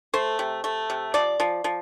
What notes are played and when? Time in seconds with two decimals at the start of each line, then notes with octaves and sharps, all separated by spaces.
0.14 A3 C5
0.39 C3
0.64 A3
0.90 C3
1.14 F3 D5
1.40 F3
1.64 F3